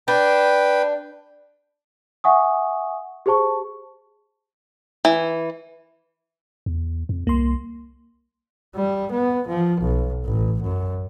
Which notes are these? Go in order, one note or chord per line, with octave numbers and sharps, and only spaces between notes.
D4 B4 G5
E5 F#5 G#5 C#6 D#6
G4 G#4 C5 A5 C#6
E3
E2
F2
C2 A#3 C6
G3
B3
F3
B1
A1
F#2